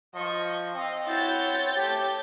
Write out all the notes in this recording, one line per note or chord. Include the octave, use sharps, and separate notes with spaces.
F3 D#5 C#6
C4 D#5 F5
E4 F#4 C#5 G6 A6
A3 G4